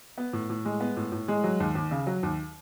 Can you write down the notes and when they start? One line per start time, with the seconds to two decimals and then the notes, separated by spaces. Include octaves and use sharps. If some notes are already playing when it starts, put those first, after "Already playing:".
0.18 B3
0.33 A2
0.50 A2
0.65 G#3
0.80 B3
0.97 A2
1.12 A2
1.28 G#3
1.44 F#3
1.60 D#2
1.75 D#2
1.91 C#3
2.07 F#3
2.23 D#2